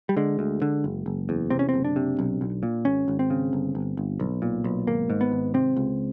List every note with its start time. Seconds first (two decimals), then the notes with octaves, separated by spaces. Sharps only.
0.09 G3
0.17 D3 G#3
0.39 D2
0.62 D3
0.84 F#1
1.06 F#1
1.29 E2
1.50 C3 C4
1.59 C#4
1.69 C4
1.74 F#1
1.85 D4
1.96 C3
2.19 B1
2.41 B1
2.63 A#2
2.85 G#1 C#4
3.08 G#1
3.19 C4
3.30 C#3
3.53 G1
3.75 G1
3.97 G1
4.20 B1
4.42 A#2
4.64 B1
4.87 G#1 A#3
5.10 G#2
5.21 B3
5.32 G#1
5.54 C3 C4
5.76 C#2